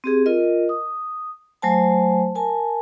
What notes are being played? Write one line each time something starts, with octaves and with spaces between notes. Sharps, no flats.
C4 G4 G#4
F4 A#4 D#5
D#6
F#3 A3 C5 G#5 A5
A#4 G#5 A5